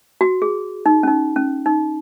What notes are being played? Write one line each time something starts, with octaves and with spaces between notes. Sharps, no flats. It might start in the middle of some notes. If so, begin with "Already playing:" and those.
F#4
G#4
D#4
C#4
D#4
C#4
D#4